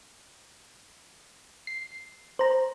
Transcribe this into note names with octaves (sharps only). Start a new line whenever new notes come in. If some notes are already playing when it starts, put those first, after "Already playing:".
C7
C5 A#5